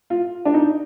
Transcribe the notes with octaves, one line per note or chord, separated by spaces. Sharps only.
F4
D4
D#4